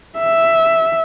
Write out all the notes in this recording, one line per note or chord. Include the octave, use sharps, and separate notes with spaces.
E5